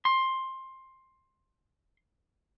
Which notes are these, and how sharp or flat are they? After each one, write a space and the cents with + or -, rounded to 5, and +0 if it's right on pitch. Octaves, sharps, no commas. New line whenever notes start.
C6 +15